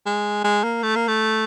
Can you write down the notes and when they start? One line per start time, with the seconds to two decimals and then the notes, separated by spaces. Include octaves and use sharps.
0.06 G#3
0.44 G#3
0.63 A#3
0.83 A3
0.96 A#3
1.08 A3